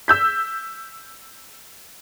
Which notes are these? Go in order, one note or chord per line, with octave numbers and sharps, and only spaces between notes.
E6 G6 B6